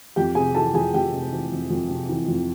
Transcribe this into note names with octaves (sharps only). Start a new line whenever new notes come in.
F2 G4 G5
C3 G#4 G#5
E3 A4 A5
F2 G#4 G#5
F2 G4 G5
C3
E3
F2
F2
C3
E3
F2